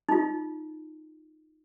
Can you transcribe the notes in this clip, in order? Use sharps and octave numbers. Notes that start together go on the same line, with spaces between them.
D#4 F4